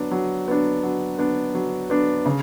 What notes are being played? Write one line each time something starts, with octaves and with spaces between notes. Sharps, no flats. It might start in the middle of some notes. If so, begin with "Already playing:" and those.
Already playing: F#3 B3 D4
F#3
B3 D4
F#3
B3 D4
F#3
B3 D4
C#3